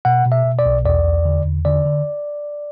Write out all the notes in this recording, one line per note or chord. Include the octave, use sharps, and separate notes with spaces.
B2 F#5
B2
E5
B2
D5
B1
E2 D5
E2
D3
E2
D3 D5
D3